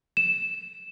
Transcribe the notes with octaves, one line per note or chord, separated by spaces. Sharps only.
E7